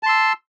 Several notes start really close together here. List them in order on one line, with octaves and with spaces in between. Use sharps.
A5 C6 E6